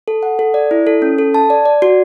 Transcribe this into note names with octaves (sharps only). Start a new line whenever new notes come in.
A4
F#5
A4
D5
E4
A4
C#4
A4
A5
D5
D5
F#4